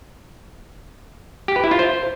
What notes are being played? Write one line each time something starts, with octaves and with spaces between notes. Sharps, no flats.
G4
B4
E4
F4
C5